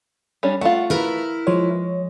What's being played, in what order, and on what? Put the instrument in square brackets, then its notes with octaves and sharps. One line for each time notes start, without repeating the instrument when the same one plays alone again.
[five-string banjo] G3 C#4 D4
[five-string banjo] A3 F4 [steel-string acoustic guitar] F#5
[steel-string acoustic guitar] E4 A#4 B4
[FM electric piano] F3 C#5 [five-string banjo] G#3